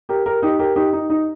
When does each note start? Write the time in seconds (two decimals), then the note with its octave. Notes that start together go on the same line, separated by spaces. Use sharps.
0.09 G4 A#4
0.26 G4 A#4
0.42 D#4 G4
0.59 G4 A#4
0.76 D#4 G4
0.93 D#4
1.10 D#4